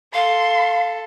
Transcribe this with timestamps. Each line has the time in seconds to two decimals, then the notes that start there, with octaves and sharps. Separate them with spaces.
0.14 A4 F5 C6